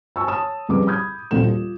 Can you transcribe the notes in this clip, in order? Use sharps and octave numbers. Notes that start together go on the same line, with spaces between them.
G#5 A5 C#6 E6
C#5 A5 D#6 E7
C2 F2 C#3 G#4 B4 D6
B5 D#6 G6 G#6
D#1 A#1 C4 A4 E7
F4